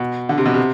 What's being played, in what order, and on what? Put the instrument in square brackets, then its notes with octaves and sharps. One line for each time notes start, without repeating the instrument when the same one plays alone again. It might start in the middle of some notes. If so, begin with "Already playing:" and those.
Already playing: [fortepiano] B2
D3
C3
B2
C3